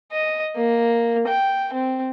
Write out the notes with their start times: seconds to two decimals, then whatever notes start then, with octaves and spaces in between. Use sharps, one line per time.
0.12 D#5
0.56 A#3
1.28 G5
1.73 C4